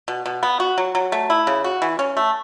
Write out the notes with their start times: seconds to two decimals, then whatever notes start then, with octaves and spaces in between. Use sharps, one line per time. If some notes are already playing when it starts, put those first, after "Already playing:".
0.08 B2
0.26 B2
0.43 B3
0.60 F#4
0.78 F#3
0.95 F#3
1.12 A3
1.30 E4
1.47 C#3
1.64 F#4
1.82 E3
1.99 C#4
2.17 A3